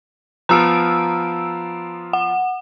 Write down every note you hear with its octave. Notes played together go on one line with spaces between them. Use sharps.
F3 B3 F4 A#5 E6 D7
F#5